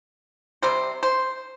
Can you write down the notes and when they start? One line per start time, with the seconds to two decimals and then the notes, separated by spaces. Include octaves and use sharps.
0.62 C3 G3 C5
1.03 C5